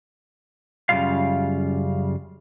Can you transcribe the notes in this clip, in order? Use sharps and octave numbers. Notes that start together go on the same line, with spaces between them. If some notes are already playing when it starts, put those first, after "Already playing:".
F#2 C#3 F3 G3 F4 F5